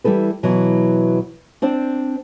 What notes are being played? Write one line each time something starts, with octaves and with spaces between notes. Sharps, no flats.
E3 G3 E4 A4 B4
B2 E3 F#3
C4 D4 C5 D5